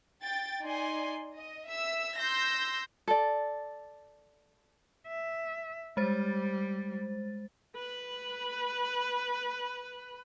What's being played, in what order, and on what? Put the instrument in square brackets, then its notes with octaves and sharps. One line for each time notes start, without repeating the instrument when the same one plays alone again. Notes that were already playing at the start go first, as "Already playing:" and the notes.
[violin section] G5 A6
D#4 D5 G#5 C6
D#5
E5 E6
C6 E6 G6 A#6
[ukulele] A4 D5
[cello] E5
[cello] G3 [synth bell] G#3 C5 A6
[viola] B4 B5